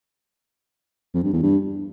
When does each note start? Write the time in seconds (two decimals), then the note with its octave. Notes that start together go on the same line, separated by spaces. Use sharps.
1.14 F2
1.23 G2
1.33 E2
1.42 G2